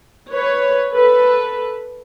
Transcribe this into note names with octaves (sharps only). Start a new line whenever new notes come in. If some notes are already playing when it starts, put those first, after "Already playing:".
B4 C#5
A4 B4